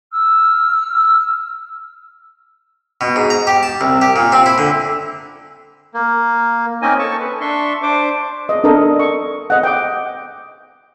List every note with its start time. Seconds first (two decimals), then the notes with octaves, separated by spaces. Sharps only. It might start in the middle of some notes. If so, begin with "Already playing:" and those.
0.12 E6 F6
3.01 B2
3.16 G#2
3.30 A#5
3.47 G4
3.63 A5
3.81 C2
4.01 G4
4.16 A#2
4.32 C4
4.46 E4
4.58 D3
5.94 A#3
6.82 A#3 C4 C#4 D#4 D#5 G#5
6.99 A4 A5 C#6
7.20 B4
7.41 D4 E5 C6 C#6
7.83 D4 C5 D6
8.49 D#5
8.64 D4 A4 A#4 D#5
8.99 C#6
9.50 D#5 F#5
9.63 G5 D6